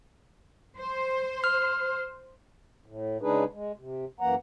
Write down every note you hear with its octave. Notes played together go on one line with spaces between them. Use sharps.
C5
F6
A2
C#3 G#3 D4 D#4 G#4 B4
G#3
C3
F#2 E3 A#3 F#5 A#5